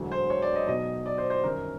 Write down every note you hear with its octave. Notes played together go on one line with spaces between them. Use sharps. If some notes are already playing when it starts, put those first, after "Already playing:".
Already playing: E1 D2 D3 F#3
C5
C#5
D5
D#5
B1 B2 F#3 D#5
D5
C5
C5
G1 F#2 D#3 A#4